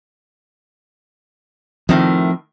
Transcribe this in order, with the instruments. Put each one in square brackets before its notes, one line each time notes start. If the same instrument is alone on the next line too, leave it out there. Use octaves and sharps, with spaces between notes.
[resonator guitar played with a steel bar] A2 D#3 [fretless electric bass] F3 C4